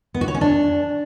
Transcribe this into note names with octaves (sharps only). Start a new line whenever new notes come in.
B3
F#4
C#5
C#4
D4